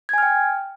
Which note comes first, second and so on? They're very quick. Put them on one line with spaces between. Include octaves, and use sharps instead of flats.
G#6 G#5 F6 G5